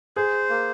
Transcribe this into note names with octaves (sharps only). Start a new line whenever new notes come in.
G#4 C5
A#3